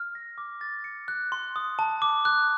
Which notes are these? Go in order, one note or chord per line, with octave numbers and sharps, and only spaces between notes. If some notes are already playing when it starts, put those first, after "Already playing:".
Already playing: F6
A#6
D6
A6
C#7
F#6
C6
D#6
A5
D6
F#6